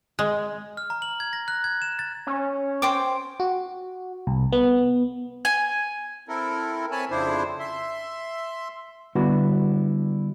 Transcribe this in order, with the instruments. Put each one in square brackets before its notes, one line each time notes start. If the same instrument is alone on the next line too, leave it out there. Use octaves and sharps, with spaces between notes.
[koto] G#3
[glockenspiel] F6
A#5
F#7
G#6
A#6
F#6
G#6
E7
A6
[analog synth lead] C#4
[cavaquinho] C5 G5 D6
[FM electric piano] F#4
C2
B3
[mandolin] G#5
[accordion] C4 E4 A4 A#4
C4 C#5 G#5 A5 B5
F2 C#3 D4 E4 C5
E5 C6
[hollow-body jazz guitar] D3 G3 B3 D4 E4 F#4